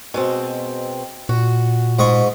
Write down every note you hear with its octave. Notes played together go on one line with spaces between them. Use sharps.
B2 G#3 C4
A#2 F#4
G#2 D#5 C#6